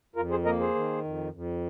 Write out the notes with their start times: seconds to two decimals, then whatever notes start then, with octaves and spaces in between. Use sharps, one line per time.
0.16 F2 F4 A#4
0.30 G#4 C5
0.45 A#3 A#4 D#5
0.60 G#4 C5
0.75 D#3
1.04 F2
1.33 F2